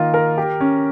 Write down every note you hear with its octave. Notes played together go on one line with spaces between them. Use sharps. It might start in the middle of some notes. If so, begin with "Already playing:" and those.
Already playing: D#3 A#3 F4
A#4
G4
C#4